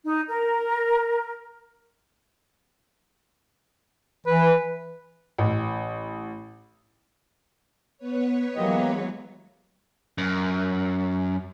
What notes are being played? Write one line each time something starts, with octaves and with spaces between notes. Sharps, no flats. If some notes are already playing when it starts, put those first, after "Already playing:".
D#4
A#4
E3 B4
A1
B3 B4 C#5
E3 F#3 G#3 A#3 G4 D#5
F#2